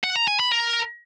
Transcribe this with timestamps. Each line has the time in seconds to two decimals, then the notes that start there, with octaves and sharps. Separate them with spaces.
0.04 F#5
0.16 A#5
0.28 G#5
0.40 B5
0.52 A#4